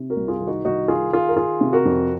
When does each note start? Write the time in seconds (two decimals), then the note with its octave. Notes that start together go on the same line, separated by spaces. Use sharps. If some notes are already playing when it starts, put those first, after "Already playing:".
Already playing: C3
0.10 F#4 A#4
0.16 C2
0.28 F4 G#4
0.40 D#3
0.47 D#4 F#4
0.65 C2 D#4 F#4
0.88 D#3 F4 G#4
1.13 D#3 F4 G#4
1.29 A#4
1.37 D#3 F4 G#4
1.61 C3
1.73 F#4 A#4
1.85 F2